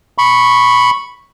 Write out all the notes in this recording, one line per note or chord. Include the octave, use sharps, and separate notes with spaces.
B5 C#6